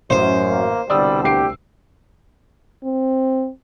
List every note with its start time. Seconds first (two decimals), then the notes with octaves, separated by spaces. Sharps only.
0.10 A1 F#2 C5
0.49 A#3
0.90 C2 B2 D3 G3 D5 D#6 E6
1.24 D2 G4 C7 D7
2.84 C4